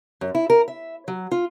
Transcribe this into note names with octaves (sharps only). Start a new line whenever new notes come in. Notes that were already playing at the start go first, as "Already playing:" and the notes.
F#2
E4
A#4
E5
F#3
F4